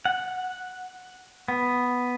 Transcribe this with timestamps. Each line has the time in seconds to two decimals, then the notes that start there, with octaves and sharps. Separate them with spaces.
0.05 F#5
1.48 B3